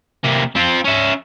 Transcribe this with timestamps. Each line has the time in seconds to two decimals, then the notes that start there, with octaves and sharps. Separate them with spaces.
0.24 C3 A#3
0.56 C4 F4
0.85 C#4 E5